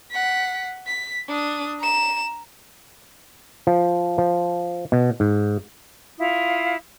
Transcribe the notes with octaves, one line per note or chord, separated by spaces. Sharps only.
F#5 B6
B6
D4 D#6
A#5 E7
F3
F3
B2
G#2
E4 F4 F5 D#6